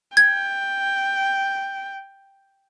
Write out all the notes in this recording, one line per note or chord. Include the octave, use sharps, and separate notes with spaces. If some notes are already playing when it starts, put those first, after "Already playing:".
G5 G#6